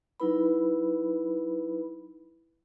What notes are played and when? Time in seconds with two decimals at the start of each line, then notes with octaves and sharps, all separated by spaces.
0.20 F#3 D#4 E4 B4 B5